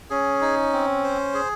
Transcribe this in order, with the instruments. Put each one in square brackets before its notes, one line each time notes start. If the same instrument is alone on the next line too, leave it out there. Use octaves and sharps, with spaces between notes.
[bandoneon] C#4 [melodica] G#4
[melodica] D#4
C4
C5
G#4